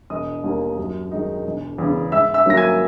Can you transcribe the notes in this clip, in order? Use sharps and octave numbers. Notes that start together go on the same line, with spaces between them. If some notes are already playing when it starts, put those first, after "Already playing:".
E1 D#5 D#6
D#2 D#3 A#3
F#2
D#3 G#3 D#4
E1
E2 C#3
G#2 E5 E6
E5 E6
D#3 F#3 A#3 C#4 A#6
G#5 G#6